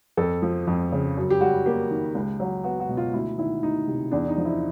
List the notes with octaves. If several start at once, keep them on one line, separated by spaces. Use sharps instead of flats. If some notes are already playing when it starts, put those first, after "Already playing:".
F2 A4
F3
F2
C#3
F#2
G4
G3 F#4
A#3 G4
D#3
C#2
F#3
B3 F#4
F#4
B2
F4
D2 E4
D#3 E4
D2 D#4
C3
E2 D4
D#4
F3
E4